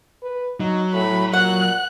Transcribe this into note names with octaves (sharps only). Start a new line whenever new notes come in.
B4
F#3 D#4
A2 B5
A#2 F#5 F#6